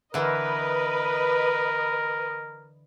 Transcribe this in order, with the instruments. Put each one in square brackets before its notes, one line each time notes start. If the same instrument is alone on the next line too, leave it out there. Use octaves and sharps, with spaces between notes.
[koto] D3 E3 [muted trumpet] A#4 [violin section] B4 D#5